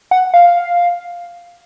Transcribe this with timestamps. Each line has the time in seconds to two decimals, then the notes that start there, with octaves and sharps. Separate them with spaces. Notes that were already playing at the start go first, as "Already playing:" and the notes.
0.11 F#5
0.34 F5